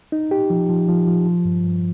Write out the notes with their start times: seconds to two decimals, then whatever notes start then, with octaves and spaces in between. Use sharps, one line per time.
0.12 D#4
0.31 G4
0.50 F3
0.70 F3
0.89 F3
1.08 F3
1.26 F3
1.45 G2
1.64 G2